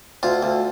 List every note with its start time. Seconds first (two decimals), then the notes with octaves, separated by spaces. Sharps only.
0.23 D2 F4
0.43 D2